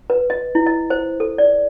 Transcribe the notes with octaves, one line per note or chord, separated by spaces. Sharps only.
B4
D#5
E4
D#5
C5
A4
D5